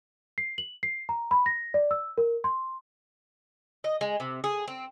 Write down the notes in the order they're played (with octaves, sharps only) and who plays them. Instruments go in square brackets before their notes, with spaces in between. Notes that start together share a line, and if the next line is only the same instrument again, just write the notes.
[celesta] C7
F#7
C7
A#5
B5
A#6
D5
E6
A#4
C6
[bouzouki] D#5
G#3
C3
G#4
C4